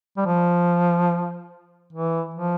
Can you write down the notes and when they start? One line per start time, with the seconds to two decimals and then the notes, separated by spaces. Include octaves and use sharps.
0.17 G3
0.26 F3
1.93 E3
2.34 F3